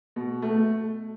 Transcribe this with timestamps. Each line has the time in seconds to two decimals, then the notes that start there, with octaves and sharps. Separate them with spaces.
0.16 B2
0.42 A3